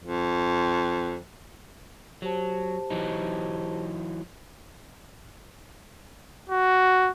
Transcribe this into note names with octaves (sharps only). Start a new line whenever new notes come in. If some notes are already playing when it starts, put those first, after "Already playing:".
F2
F#3 G4 C5 A5
E3 F#3 D#4
F#4